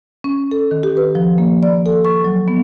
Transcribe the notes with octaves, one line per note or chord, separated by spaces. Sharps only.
C#4
A4
D#3
G4
B4
F3
A#3
D5
A4
C#6
F#3
B3